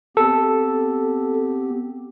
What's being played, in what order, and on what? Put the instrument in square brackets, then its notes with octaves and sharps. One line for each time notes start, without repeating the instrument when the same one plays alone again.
[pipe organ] B3 C4 G4 [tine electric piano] A4